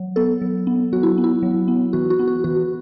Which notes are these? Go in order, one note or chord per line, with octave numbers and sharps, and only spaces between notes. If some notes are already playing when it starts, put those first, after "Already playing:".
Already playing: F#3
B3 A4
F#3
B3
F#3 F#4
E4
B3
E4
F#3
B3
E3 F#4
F#4
B3
F#4
E3 F#4